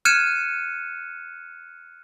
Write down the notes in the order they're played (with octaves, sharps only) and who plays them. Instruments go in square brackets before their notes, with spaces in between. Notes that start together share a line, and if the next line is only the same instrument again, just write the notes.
[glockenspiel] F6 F#6 G#6 C#7 D#7 E7